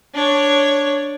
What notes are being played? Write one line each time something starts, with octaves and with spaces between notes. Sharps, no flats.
D4 C#5